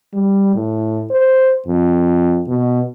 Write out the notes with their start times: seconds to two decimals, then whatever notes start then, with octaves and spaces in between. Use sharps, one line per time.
0.14 G3
0.55 A2
1.11 C5
1.67 F2
2.48 B2